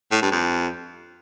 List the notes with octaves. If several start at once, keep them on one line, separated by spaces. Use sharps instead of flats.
A2
G2
F2